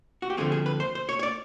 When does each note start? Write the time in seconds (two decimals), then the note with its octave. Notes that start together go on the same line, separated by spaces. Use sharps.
0.22 F#4
0.30 G4
0.37 D2 D3 F3 A3 C4 G#4
0.52 G#4
0.66 B4
0.80 C5
0.95 C5
1.09 C#5
1.19 C#5
1.23 D5